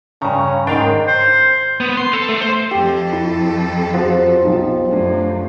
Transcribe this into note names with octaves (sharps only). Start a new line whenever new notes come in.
G2 C#3 C#4 A#5 C#6
G#2 D#3 D4 F5 G5
C5
B3
C6
A4
A3
C5
F2 G4 A4
E4
F3 F#4 G#4 F#5
B1 D#4 F4
F#2 A3 D4